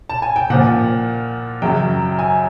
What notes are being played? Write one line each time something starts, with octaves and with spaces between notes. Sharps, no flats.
A5
G#5
G5
A#2 F3 F#5
F#2 C#3 F#3 G5
G#5